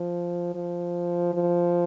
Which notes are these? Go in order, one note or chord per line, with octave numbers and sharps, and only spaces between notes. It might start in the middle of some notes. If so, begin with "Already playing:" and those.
Already playing: F3
F3
F3